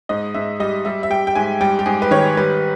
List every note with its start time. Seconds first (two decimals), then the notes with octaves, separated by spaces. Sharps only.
0.09 G#2 D#5
0.34 G#2 E5
0.60 G3 D#5
0.85 G3 E5
1.03 E5
1.10 G3 G5
1.27 G5
1.35 G#2 G#5
1.61 G3 G5
1.79 G4
1.86 G#2 G#4
2.02 B4
2.11 D#3 C#5
2.37 G3 B4